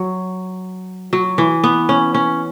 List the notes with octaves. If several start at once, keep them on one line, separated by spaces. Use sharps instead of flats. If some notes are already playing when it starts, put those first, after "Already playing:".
Already playing: F#3
F#3
E3
B3
C#4
C#4